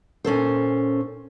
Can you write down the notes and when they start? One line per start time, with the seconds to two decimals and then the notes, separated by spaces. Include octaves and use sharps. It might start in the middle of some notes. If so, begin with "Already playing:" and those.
0.24 A#2 C#4 A4 C5